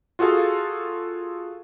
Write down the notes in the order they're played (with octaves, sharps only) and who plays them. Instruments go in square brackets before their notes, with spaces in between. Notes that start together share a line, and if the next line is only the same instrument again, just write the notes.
[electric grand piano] F4 F#4 G#4 A4 F5